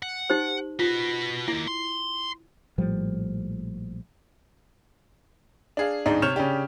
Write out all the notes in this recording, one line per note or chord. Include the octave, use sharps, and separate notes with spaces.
F#5
D#4 G4 C5
F4 F#4 B4
D#3 A#3 E4
C6
A#1 A2 F3 G3
D4 G#4 F5
D1 G#2 D4 D#4
C3 C#5 F6 G6 E7 F7
C#3 C#4 D4 G4